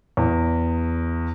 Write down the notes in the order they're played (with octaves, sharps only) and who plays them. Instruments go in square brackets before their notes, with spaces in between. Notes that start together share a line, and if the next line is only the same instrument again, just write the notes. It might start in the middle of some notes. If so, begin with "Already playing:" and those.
[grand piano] E2